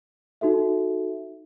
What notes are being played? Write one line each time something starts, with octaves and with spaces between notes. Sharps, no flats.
D#4 F#4 A4 E5